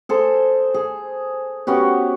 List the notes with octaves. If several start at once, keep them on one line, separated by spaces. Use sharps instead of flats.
G#4 A4 C5
G#4
B3 C#4 F#4 G4